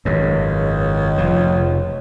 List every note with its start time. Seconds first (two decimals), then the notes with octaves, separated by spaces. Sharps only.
0.05 G#1 C#2 F#2
1.18 F1 F3